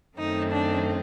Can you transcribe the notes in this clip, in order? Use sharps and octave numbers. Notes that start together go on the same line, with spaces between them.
F#2 D#3 A3 C4 D#4
D4